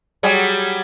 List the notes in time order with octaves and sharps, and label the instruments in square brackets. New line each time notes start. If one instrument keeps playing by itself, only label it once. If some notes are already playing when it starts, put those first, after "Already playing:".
[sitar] F#3 G3 G#4